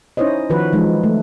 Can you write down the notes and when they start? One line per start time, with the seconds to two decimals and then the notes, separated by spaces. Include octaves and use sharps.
0.17 C#4 D#4 E4 C5 C#5 D#5
0.50 D#3 F3 F#4 B4
0.73 E3 F3 G#3 D#4
1.03 A3